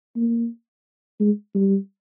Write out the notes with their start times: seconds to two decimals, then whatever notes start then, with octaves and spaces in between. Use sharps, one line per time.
0.16 A#3
1.20 G#3
1.55 G3